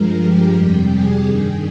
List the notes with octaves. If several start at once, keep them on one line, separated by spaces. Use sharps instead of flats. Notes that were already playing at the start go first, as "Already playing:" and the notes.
Already playing: G2 F3 G#3 A#4
G4
F2 C3 G3 G4
G#4
G2 D#3 G3 G#4